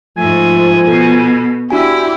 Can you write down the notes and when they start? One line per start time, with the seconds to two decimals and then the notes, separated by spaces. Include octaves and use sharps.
0.17 G#2 F3 A3 G#5
0.87 B2 A4
1.70 D4 E4 F#4 G4 G#5